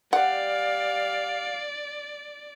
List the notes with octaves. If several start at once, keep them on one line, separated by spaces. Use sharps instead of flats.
G3 D5 F5 F#5